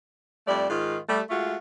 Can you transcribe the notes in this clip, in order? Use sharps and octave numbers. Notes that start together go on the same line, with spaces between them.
F2 G3 A3 D5
G#2 D#3 F4
G3 A3
G#3 A3 F4 F#4